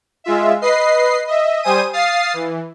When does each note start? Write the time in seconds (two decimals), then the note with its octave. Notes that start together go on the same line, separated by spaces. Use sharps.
0.24 G#3 F4 E5
0.61 B4 D#5 C7
1.27 D#5 E5
1.62 G3 C5 G#5 D#6 D#7
1.93 F5 D#6 A6 C7
2.33 E3